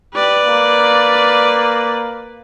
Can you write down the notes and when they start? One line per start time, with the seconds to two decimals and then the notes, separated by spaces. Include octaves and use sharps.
0.14 G4 B4 D5
0.45 A#3